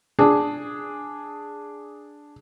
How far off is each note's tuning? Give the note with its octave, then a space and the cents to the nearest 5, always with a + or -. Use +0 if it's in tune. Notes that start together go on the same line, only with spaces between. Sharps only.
D4 +0 G#4 +0